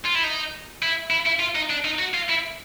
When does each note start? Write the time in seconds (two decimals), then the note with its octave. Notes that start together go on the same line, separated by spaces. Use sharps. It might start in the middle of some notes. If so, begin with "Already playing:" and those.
0.05 F4
0.14 E4
0.23 D#4
0.83 E4
1.11 E4
1.26 E4
1.40 F4
1.56 D#4
1.70 D4
1.85 D#4
1.99 F#4
2.14 F4
2.29 E4